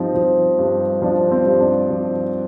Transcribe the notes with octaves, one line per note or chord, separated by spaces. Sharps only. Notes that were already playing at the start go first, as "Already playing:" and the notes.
Already playing: G2 F3 C4 D#4
F3
G2
F3 D4
C4
G2
D4
F3